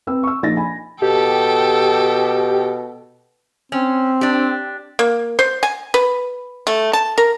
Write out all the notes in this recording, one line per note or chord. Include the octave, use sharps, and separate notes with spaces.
C4 B4 E6
C#6 E6
A#1 D#4 D#5 A6 A#6
G#5 B5
B2 G4 A4 G5
C4 C#4
D4 G4
A#3
C5
G#5
B4
A3
A5
A#4